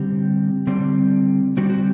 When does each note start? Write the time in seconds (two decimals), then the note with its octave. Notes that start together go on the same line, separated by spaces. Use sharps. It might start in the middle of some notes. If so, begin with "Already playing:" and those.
Already playing: D3 G3 C4 G4
0.67 D3 G3 C4
1.57 D3 G3 C4 F#4
1.70 F#4